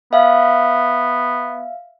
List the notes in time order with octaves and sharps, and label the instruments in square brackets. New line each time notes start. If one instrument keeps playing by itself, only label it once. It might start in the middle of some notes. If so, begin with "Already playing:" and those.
[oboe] B3 [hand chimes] E5 F5